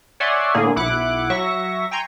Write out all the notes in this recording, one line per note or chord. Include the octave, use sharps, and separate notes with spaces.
C#5 D5 E5 F#5 G#5 C6
A2 D3 A#3 G#4
B1 E4 F#5 D6 F#6
F#3 E5 C#6 A#6
G5 G#5 A#5 C6 C#6